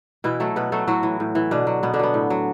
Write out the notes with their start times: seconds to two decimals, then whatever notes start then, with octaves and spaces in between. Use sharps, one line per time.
0.24 B2 E3 E4
0.40 F#3 A3 A4
0.56 B2 B3 B4
0.72 F#3 A3 A4
0.88 A2 F#3 F#4
1.03 E3
1.20 A2
1.35 E3
1.51 B2 D3 D4
1.67 F#3
1.83 B2 B3
1.94 D3 D4
1.99 F#3 B3
2.14 A2
2.30 F#3